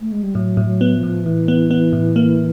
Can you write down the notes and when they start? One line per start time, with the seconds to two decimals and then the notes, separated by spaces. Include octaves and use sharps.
0.01 A3
0.12 G#3
0.23 G3
0.35 A2 F#3
0.57 A2
0.65 F#3
0.81 B3
0.96 F3
1.03 A2
1.25 A2 E3
1.48 B3
1.71 B3
1.93 A2
2.16 A#3